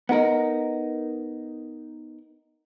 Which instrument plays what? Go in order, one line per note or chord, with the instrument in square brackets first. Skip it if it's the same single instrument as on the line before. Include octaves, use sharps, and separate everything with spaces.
[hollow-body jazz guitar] B3 D#4 A#4 [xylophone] D#5 F#5